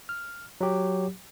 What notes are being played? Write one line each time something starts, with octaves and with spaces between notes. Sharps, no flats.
F6
F#3 G4